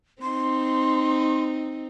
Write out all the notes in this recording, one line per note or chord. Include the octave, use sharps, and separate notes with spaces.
C4 D#4 C6